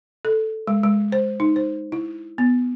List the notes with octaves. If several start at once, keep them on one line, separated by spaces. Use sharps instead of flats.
A4
G#3
G#3
C5
D#4
C5
E4
B3